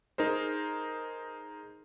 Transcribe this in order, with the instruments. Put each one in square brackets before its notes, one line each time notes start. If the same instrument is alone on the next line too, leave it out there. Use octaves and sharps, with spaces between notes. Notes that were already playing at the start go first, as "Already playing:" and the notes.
[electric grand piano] D#4 G#4 A#4 C5